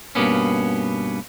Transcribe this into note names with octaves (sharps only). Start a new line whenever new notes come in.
G2 B2 E3 A#3 B3 C#4